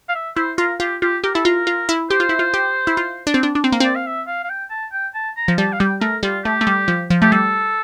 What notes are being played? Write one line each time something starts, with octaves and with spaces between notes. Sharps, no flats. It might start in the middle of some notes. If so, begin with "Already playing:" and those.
F5
E5
E4 C5
F4 A#4
F4 G4
F4 G4
G4 A#4
E4 A4
F4 A#4
F4
E4
G4 C5
F4
E4
F4
G4
E4
F4
D4
C4
D4
D4
C4
A#3
C4 D5
F5
E5
F5
F5
G5
A5
G5
A5
A#5
F3
G3 A5
F5
G3 G5
A3 A#4
G3 F4
A3 G4
A3
G3
F3
F3
A3 G4
G3 A4